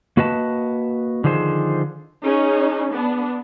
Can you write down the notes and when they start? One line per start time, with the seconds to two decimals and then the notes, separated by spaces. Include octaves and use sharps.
0.17 A#3 F#4 B4 D#5 A5
1.24 D3 D#3 F3 G#4 C5
2.22 C#4 D#4 G#4
2.93 B3 D4